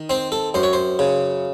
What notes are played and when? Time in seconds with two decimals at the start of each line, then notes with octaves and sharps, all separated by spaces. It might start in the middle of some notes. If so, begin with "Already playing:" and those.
Already playing: D#3
0.10 C4 C5
0.32 A4
0.54 F#2 C5
0.63 C#5
0.73 C5
0.99 C#3